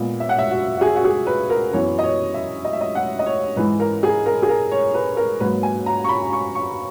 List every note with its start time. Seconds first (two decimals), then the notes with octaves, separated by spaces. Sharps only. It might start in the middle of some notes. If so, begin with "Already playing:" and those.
Already playing: A#2 G#3 B3
0.20 E5
0.29 F#5
0.38 E5
0.50 F#4
0.78 F#4
0.81 G#4
0.96 F#4
1.04 G#4
1.27 B4
1.50 A#4
1.73 F#2 E3 B3 C#5
1.99 D#5
2.03 C#5
2.34 E5
2.65 D#5
2.73 E5
2.81 D#5
2.95 F#5
3.19 D#5
3.26 C#5
3.56 G#2 E3 G#3 B4
3.80 A#4
4.03 G#4
4.26 A#4
4.42 G#4
4.49 A#4
4.71 C#5
4.94 B4
5.17 A#4
5.40 G#2 F#3 A#3 B4
5.63 G#5
5.86 A#5
6.04 C#6
6.09 B5
6.33 C#6
6.55 C#6